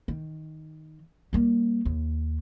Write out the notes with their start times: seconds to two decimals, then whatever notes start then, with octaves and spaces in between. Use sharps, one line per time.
0.08 D#3
1.33 G3 A#3
1.85 D#2